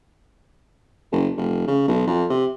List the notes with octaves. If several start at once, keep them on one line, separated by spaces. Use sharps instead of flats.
F#1
F1
C#3
B1
F2
C3